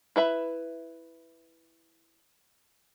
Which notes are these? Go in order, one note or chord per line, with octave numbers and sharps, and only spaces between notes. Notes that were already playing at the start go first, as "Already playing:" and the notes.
E4 B4 E5 B5